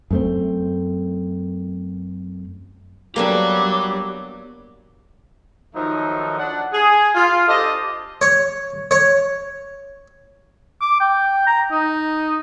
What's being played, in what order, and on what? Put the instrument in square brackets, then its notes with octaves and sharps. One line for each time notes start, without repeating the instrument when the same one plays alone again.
[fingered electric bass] F#2 A3 C4
[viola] F#3 [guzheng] A#3 B3 D4 [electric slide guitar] G4 D5 G5 [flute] D6
[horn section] D#3 F3 F#3 A3 D#4
D4 F#5
G#4
F4
D4 G4 A4 C5 D#5
[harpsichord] C#5
C#5
[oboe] D6
G5
A#5
D#4